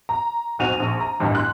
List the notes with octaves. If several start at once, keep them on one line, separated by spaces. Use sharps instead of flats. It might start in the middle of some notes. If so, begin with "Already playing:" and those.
A#5
B1 F2 F#4 D#7 F7
A#1 C#6
A#5
A1 D2 G2 D#3
C6 F#6